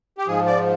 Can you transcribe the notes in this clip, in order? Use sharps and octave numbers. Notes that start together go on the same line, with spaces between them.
G4
G#2 F3 G#4
D5